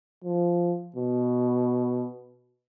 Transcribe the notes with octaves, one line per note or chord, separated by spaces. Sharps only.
F3
B2